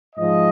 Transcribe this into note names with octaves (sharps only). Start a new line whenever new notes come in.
G#2 F3 G#3 D#5